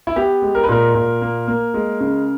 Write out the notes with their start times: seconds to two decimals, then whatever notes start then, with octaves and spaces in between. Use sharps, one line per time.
0.07 E4
0.16 B3 G4
0.42 G#3
0.55 A#4
0.63 B4
0.69 A#2 A#4
0.95 A#2
1.22 A#3
1.48 A#3
1.74 G#3
2.00 C#3